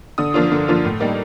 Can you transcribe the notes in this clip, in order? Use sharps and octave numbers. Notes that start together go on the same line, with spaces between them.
D3 D#6
F3 A#3 D4 F4
D3
F3 A#3 D4 F4
A2
G3 A#3 D#4